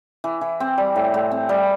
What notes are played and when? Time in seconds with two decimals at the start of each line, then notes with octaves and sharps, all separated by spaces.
0.24 E3
0.41 E3
0.60 C4
0.78 G3
0.96 A2
1.14 A2
1.31 C4
1.49 G3